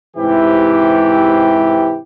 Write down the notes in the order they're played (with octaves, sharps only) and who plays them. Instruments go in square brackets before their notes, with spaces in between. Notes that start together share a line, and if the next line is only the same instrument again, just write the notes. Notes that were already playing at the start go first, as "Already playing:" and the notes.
[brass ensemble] G#2 C3 E3 E4 G4